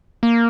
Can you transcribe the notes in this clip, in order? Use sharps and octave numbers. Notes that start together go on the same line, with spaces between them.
A#3